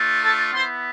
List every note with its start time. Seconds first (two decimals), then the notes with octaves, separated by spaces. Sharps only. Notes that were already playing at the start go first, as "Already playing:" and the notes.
Already playing: A3 D4 F4
0.23 A4 A5
0.53 B3 E4 C5 C6